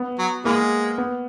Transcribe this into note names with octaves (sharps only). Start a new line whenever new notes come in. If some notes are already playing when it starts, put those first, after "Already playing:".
Already playing: B3
F#3
E3 G#3 A#3
B3